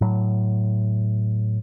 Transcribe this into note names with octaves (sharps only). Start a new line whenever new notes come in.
A2 F#3